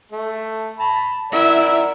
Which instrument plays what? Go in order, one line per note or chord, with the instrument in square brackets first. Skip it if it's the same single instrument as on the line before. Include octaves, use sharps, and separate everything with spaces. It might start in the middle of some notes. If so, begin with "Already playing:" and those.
[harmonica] A3
A5 B5
[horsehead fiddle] E4 E5 [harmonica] A#4 D5 F#5